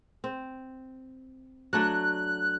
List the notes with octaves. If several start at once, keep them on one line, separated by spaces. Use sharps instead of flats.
C4
F#3 A3 D4 F#6